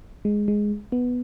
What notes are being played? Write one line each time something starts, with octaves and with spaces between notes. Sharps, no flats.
G#3
G#3
B3